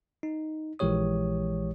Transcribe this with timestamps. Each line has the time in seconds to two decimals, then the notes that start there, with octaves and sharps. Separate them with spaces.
0.23 D#4
0.79 A#1 E3 G#3 G4 C#5 D#6